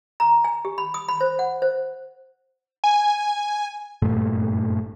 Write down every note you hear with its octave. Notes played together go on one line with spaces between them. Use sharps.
A#5
G#5
G4
B5
D#6
B5
C5
F#5
C5
G#5
F#1 G2 A#2 A3